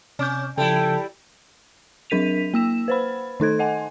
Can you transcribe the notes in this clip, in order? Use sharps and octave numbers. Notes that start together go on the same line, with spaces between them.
C3 C#4 D6 G6
C#3 F3 G3 E4 A4 G5
F#3 D4 A#4 B6 D#7 F7
A#3 E6 E7
B4 C5 B5
D#3 D#4 A4 G#6
D#5 F#5 G#5